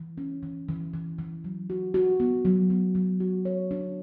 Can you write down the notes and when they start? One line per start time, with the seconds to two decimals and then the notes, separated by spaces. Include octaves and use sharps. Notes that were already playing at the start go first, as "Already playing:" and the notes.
Already playing: E3
0.18 C#4
0.43 E3
0.69 E3
0.94 E3
1.19 E3
1.44 F#3
1.70 F#4
1.94 F#4
2.20 B3
2.45 F#3
2.70 B3
2.95 F#3
3.20 F#4
3.45 C#5
3.71 D4